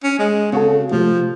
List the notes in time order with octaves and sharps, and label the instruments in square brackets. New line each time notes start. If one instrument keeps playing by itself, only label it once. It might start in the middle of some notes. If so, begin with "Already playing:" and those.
[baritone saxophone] C#4
G#3
[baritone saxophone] C#3 [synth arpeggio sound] C4 F#4 A4
[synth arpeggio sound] C3 A3 G4 [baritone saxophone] F3